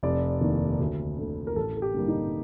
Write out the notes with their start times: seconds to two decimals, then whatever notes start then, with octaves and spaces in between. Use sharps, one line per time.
0.03 F1 D5
0.41 D#2 D#3 A#3
0.80 D2
1.18 D3 A3
1.47 A#4
1.56 A1 A4
1.77 A4
1.82 G4
1.94 G2 D3 G3 A#3
2.08 D#4